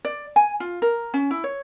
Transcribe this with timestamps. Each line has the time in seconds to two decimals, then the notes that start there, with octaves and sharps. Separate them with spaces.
0.05 D5
0.36 G#5
0.60 F4
0.82 A#4
1.14 C#4
1.31 E4
1.44 C#5